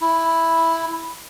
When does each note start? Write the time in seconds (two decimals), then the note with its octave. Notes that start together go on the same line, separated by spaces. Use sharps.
0.01 E4